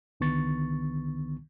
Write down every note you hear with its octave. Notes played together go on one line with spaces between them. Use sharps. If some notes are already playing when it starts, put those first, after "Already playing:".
C2 D3 D#3 B3 C#6 A6